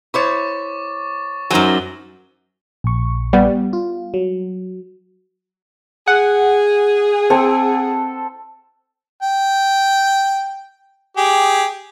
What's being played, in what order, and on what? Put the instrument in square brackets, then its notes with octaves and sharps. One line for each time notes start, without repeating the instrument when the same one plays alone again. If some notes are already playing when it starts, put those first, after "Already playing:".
[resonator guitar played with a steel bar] E4 C5 C#5 [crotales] C#6 D6 A6
[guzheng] F#2 F#3 [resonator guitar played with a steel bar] D#4 C5 G#5 [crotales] E6 G7
[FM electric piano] A#1 C#6
[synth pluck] G3 B3
[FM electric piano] F4
F#3
[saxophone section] G#4 [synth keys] F#5
[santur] C4 A4
[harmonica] G5
G4 G#4